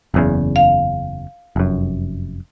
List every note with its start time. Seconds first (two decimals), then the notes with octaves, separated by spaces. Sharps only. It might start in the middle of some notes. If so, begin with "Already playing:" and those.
0.14 F#1 E2 C#3
0.56 F5
1.56 F1 F#2